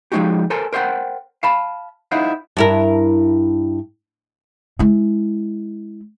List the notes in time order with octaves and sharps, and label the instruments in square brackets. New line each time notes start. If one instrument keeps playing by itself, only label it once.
[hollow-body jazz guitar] F3 G#3 A#3 D#4 F#4 G4
A4 A#4 C5 G#5 A5
A#4 C5 D#5 F#5 G5
F5 A5 B5
D#4 E4 C5 F5 F#5
[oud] G2 E4 A#4
[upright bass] G#3 E4